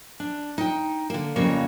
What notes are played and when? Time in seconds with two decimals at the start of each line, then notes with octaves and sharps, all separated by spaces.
0.20 D4
0.58 D#4 G5
1.10 D3 A#3
1.36 F2 C#3 G3 A#3 B3 C#5